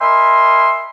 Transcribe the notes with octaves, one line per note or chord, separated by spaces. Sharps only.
A#4 D#5 E5 G#5 B5 C6